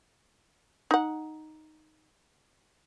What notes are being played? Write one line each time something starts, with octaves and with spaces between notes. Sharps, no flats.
D#4 F#5